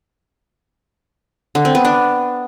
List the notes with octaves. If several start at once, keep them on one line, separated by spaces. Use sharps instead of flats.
D3
C4
B3
D4